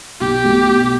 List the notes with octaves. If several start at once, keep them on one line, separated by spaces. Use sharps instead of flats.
B1 G4
B2 F#3 A3
B2